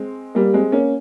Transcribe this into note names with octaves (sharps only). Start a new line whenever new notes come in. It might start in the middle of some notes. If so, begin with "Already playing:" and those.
Already playing: G#3 C4
G3 A#3
G#3 C4
A#3 C#4